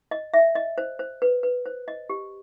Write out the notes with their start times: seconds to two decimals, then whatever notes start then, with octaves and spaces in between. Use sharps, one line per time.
0.11 D#5
0.34 E5
0.55 D#5
0.78 C5
0.99 C5
1.22 B4
1.43 B4
1.66 C5
1.88 D#5
2.10 G4